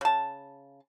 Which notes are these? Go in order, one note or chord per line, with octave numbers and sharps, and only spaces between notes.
C#3 A5